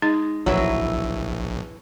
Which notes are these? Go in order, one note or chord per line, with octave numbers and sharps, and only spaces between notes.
G#3 D#4
A#1 E3 F#3 E4 B4